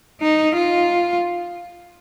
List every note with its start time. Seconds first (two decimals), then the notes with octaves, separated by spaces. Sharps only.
0.22 D#4
0.55 F4